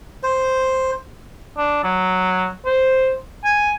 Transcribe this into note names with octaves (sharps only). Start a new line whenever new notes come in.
C5
D4
F#3
C5
G#5